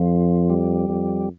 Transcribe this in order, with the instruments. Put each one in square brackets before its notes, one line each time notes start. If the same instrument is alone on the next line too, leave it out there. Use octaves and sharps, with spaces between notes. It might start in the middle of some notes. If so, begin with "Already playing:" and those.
Already playing: [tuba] F2 [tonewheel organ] F3
[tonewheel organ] G3
[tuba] F2